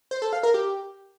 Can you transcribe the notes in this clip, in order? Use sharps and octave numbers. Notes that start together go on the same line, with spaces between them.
C5
A4
F5
A#4
G4